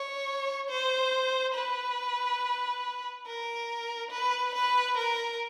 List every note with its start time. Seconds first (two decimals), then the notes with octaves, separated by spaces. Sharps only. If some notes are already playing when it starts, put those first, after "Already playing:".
Already playing: C#5
0.69 C5
1.54 B4
3.26 A#4
4.11 B4
4.55 B4
4.97 A#4